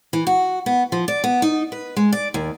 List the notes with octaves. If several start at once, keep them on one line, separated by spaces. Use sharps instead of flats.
E3
F#4
B3
F3
D5
B3
D#4
B4
G#3
D5
D#2